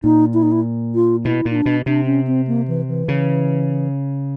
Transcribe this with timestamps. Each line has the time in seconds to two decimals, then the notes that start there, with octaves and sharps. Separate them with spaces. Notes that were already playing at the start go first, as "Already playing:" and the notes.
0.04 A#2 D#4
0.34 E4
0.43 D#4
0.52 E4
0.95 F4
1.25 B2 E4
1.45 A#2
1.51 D#4
1.55 D4
1.66 B2
1.86 C3 D4
2.06 C#4
2.27 C4
2.47 A#3
2.68 E3
2.88 E3
3.08 C#3